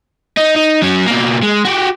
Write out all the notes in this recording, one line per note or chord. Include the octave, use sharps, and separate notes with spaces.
D#4
D#4
F#3 C#4
B2 A#3
G#3
F#4 G4